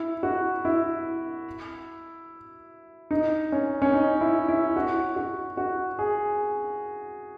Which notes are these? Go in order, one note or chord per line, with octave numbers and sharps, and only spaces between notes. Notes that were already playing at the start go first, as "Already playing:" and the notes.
Already playing: E4
F#4
E4
D#4
C#4
C#4
D#4
E4
E4
F#4
F#4
F#4
G#4